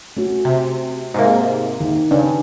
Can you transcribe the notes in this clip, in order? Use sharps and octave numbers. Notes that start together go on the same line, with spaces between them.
A3 C#4 F#4
C3
G#2 C3 A#3
D#3
G2 C#3 C#4